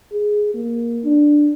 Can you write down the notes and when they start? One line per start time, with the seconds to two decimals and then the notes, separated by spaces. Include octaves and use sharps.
0.13 G#4
0.54 A#3
1.04 D4